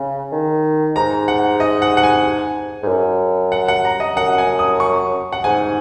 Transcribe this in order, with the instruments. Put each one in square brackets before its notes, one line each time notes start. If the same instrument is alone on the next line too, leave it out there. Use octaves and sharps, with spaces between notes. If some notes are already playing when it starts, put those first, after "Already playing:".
Already playing: [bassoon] C#3
D#3
[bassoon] G#2 [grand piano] A#5
[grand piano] F#5
D#5
F#5
F#5
G#5
[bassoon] G#2
F#2
[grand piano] F#5
F#5
A#5
D#5
[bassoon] F#2 [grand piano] F#5
[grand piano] G#5
D#6
C#6
F#5
[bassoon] G#2 [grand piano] G#5